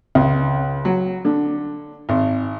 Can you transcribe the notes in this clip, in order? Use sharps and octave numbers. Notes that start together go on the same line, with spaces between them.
C#2
F#3
D3
G#1